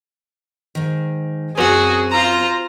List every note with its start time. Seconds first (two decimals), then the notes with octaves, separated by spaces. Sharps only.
0.75 G#2 D#3
1.57 F#2 C4 F#4 G#4
2.11 F4 C5 A#5